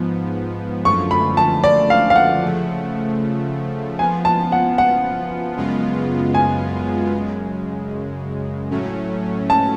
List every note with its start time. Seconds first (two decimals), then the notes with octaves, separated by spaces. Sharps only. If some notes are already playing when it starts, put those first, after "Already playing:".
Already playing: G#2 F3 B3
0.85 F#2 D3 F3 A3 F4 C#6
1.11 B5
1.37 A5
1.64 D5
1.90 F5
2.10 F5
2.16 F#5
2.42 C#3 F3 A3
3.99 F3 B3 F4 G#5
4.25 A5
4.52 F#5
4.78 F#5
5.57 F#2 C#3 G#3 B3 F4
6.35 G#5
7.14 F#2 C#3 G#3
8.71 A2 F#3 A3 C#4
9.50 A5